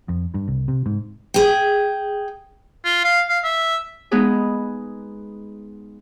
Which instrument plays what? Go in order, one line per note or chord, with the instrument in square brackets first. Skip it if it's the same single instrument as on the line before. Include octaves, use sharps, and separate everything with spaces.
[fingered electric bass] F2
G2
C2
C3
G#2
[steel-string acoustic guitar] G#4 G5
[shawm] F4
F5
F5
E5
[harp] G#3 B3 D#4 G#4 B4